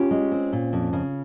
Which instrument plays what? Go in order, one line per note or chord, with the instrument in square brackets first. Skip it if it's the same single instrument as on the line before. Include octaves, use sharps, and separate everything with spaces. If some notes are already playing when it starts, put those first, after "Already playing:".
Already playing: [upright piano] C#4 F4 [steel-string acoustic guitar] G4
[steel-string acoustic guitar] G#3
C4
A#2
F2
C#3